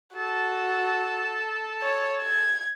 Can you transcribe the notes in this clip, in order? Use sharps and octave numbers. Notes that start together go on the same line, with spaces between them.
F#4 A4 A5
C#5
G#6